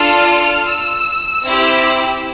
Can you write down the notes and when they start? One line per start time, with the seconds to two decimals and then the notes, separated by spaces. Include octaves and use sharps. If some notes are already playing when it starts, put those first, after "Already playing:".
Already playing: D4 F4 A4 F6
0.67 E6
1.45 C4 E4 G4